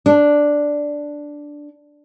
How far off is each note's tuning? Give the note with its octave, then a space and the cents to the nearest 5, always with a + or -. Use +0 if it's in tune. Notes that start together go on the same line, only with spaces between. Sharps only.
D4 +0